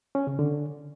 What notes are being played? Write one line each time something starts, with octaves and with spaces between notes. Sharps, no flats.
C#4
C#3
D3